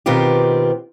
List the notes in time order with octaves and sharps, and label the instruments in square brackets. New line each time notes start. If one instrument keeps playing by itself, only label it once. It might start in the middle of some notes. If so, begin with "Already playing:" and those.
[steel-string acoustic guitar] B2 D#3 B3 C4 F4 G4